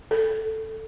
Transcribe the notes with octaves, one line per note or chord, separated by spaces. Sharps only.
A4